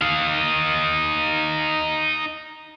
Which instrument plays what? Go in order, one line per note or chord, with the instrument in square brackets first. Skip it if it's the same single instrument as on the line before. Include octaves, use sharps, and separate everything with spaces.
[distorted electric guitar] D#4 F5